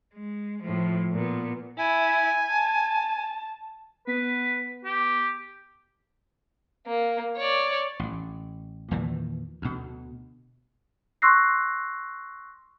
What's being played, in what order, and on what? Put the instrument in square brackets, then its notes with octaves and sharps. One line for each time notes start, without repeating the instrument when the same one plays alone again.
[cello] G#3
A2 F3
A#2 B3
[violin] E4 [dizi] G#5
[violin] A5
[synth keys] B3 B6 [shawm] B4
[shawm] G4
[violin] A#3
C#5 D5
[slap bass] A1
E2 A#2 D#3 E3
D2 B2
[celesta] C6 C#6 E6 F#6 A#6 C7